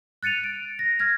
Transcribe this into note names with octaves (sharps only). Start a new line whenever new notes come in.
F#6 A6 C#7 D#7 F7
D7
A#6
F6 G#6 A#6